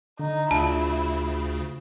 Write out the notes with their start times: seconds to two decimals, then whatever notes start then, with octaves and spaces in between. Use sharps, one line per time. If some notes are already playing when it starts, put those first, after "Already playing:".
0.19 D3 D#4
0.51 D2 C#3 D4 E4 F4 A5